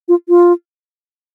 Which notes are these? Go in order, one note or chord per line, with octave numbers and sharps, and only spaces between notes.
F4
F4